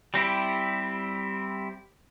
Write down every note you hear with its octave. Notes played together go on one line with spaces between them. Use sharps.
G3 C4 E4 G4